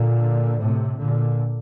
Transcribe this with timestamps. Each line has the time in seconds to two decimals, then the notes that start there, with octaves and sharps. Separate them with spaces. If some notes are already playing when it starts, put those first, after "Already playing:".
Already playing: A#2 D3
0.60 A2 C3
0.98 A#2 D3